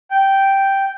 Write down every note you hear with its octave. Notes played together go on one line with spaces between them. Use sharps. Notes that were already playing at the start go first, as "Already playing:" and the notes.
G5